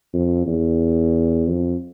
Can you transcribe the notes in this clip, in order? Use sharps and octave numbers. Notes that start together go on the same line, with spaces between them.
F2
E2
F2